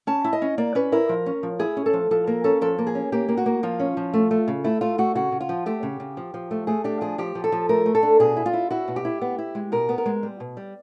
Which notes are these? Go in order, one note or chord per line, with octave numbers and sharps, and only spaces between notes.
C#4 A5
E4
D#5
C#4
A#3 D5
C#4 B4
E4 A#4
F3
C#4
F3
E4 G#4
C#4
A4
F3
F3 A4
A#3 A#4
C#4 A4
F3 A4
A#3
G#4
C#4
A#3 G4
A#3
F#4
A#3
F3 F4
C#4
F3
A3
A3
C#3
A3 E4
A3 F4
A3 F#4
C#3 F#4
C#3
F4
F3
A3 G4
C#3
C#3
F3
F3
A3
A3 G#4
D4 G4
F3 G#4
F3 G4
F3
A4
F3
A3 A#4
A3
A4
D4
B2 G#4
E4
F4
E4
E4 F#4
B2
G4
E4
B3
E4
G#3
B2 A#4
B3
A#4
G#3
G3
B2
G3